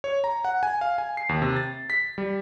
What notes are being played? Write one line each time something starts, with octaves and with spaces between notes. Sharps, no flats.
C#5
A#5
F#5
G#5
F5
G#5
C7
D#2
C3
A6
B6
G3